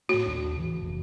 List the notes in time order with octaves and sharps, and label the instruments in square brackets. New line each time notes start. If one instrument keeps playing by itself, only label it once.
[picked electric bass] A2 A3 [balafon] F#4
[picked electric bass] A#1 D#2 D4
C#3 E3
F1 A#1